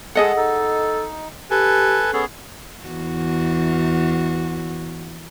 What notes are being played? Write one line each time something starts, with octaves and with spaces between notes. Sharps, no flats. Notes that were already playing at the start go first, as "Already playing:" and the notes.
G#3 G#4 A4 D#5 F#5
D#4 A4
G4 A4 B4 G#5
B3 C#4 G#4 A4
E2 F#4